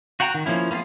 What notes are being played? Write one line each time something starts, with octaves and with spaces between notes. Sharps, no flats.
F#4 F#5 G5 A#5
D#3
F3 A#3 C#4 E4
A#3 B3 E4 F4 G#4